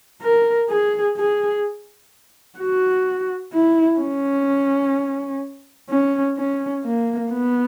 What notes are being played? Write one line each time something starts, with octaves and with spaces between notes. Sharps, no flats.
A#4
G#4
G#4
F#4
E4
C#4
C#4
C#4
A#3
B3